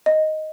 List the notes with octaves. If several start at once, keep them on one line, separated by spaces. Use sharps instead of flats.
D#5